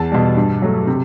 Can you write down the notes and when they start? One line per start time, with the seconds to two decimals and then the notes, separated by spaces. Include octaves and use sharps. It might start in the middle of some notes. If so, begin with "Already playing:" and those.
Already playing: E2 A5
0.12 B2 G3
0.37 G2
0.62 F#3 A3
0.87 C3